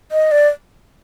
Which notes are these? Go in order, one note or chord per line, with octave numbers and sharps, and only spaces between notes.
D#5
D5